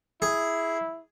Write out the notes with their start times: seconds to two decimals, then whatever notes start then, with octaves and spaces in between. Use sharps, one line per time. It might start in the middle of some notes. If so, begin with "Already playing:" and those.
0.22 E4 G#4